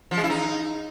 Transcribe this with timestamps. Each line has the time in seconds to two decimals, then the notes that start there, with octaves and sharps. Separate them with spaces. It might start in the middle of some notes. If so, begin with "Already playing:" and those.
0.11 F3
0.17 G#3
0.24 E4
0.30 D#4